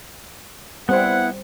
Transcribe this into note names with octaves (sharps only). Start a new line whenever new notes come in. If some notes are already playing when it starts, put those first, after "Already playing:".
G3 B3 C4 E4 C5 F#5